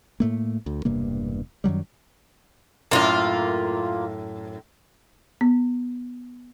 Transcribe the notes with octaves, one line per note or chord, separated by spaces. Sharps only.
A2 A3 A#3
D2
E1 G2 C3 A#3
F#2 D#3 F#3 G3
F#2 A2 A#3 F4
B3